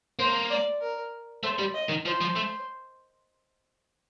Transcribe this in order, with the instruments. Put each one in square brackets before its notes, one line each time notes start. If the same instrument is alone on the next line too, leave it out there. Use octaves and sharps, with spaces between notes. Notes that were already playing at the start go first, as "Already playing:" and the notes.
[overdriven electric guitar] A#3 [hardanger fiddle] C5
[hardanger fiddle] D5
A#4
[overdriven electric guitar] A3 [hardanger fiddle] C5
[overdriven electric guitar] G3
[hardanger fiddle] D#5
[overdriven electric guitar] D#3
[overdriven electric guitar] F3 [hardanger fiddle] C5
[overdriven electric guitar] F3
A3